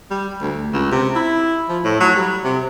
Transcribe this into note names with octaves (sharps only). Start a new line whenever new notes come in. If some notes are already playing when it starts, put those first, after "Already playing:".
G3
D2
C#2
C3
E4
F3
A2
F#3
G3
C3